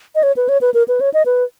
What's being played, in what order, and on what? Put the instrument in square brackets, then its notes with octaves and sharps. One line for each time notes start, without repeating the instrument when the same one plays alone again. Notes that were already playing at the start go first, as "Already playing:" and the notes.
[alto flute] D#5
C#5
B4
C#5
B4
A#4
B4
C#5
D#5
B4